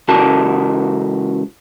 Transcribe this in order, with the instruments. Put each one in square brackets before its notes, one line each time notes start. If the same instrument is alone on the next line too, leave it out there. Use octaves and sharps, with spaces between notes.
[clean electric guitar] C#2 C#3 E3 F#4 A#4 A5